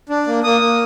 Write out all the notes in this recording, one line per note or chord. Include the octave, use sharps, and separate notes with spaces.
D4
A#3
A#3 D#6
A#3